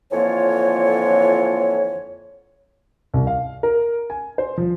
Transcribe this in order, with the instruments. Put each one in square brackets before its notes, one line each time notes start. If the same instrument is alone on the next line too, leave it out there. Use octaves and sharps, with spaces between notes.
[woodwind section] F2 D3 E3 A#3 F4 C#5
[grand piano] C2
F5
A#4
G#5
C5
F3